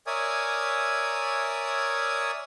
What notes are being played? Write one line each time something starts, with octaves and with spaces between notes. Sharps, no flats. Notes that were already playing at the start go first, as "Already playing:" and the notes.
A#4 C#5 D5 E5 G#5 D#6